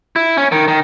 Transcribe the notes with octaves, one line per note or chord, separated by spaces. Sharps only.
E4
C#4
D#3
D#3